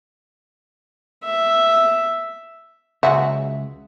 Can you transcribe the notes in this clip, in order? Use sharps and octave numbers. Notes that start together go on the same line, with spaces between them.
E5
C#2 G2 C#3 F#3 G#3 F#4 E5